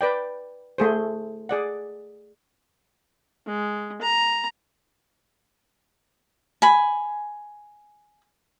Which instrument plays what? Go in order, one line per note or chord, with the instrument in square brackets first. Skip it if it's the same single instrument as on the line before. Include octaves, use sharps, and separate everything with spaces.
[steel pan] B4 D5 G5
A3 G#4 C5
G#4 D5 F#5
[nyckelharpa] G#3
A#5
[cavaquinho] G#5 B5